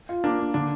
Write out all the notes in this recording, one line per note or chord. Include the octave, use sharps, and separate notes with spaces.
F4
A#3 D4
A#3
D3 D4